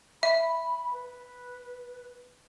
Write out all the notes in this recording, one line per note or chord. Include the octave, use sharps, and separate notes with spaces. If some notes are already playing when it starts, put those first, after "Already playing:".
E5 B5
B4